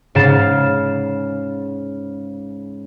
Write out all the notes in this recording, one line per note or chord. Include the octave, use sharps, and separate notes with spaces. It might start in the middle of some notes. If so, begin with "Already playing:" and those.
G#2 C#3 F5 A6 C7 E7